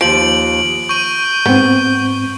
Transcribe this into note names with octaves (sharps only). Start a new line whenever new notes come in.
D#2 F3 D7 F#7
C#6 G6 D#7
G#2 B3 C4